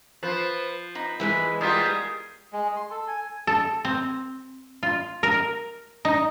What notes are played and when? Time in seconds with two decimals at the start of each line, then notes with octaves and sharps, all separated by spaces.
0.23 F3 B4
0.95 D#4 B4
1.20 E3 G#3 G#4 B4 E5
1.61 G3 B3 F4 G4 G#4 A#4
2.53 G#3
2.76 C6
2.91 A4
3.08 G#5
3.47 A4
3.85 C4
4.83 F4
5.23 A#4
6.05 D#4